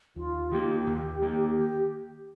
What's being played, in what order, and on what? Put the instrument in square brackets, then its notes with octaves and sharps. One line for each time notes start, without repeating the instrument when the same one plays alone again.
[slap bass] D#2 [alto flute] F4
[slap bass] D#3 A#3 [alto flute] G4
[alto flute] F4
G4
[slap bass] D#2
D#3 A#3
[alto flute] G4